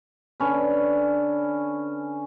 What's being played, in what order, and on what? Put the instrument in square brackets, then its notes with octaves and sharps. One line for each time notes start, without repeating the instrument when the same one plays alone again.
[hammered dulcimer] D3 C#4 B4